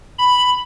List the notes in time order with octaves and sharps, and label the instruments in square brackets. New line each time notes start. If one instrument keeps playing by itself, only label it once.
[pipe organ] B5